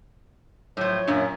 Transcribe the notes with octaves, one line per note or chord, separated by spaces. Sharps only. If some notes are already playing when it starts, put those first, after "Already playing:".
A2 F3 F#3 C#5
F#2 A#2 D4